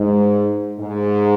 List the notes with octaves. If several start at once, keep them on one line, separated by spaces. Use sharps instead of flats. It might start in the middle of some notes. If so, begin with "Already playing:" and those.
Already playing: G#2
G#2